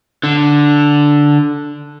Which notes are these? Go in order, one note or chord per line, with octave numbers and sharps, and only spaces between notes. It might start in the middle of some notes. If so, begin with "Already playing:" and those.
D3